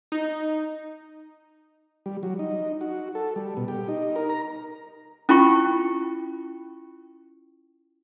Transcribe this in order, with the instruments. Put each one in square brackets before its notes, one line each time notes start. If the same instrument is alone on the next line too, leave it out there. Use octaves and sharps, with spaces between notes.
[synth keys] D#4
[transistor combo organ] G3
F#3
D#4
F#4
A4
G3
B2
G4
D#4
A#4
A#5
[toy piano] C#4 E4 F4 G5 B5 C#6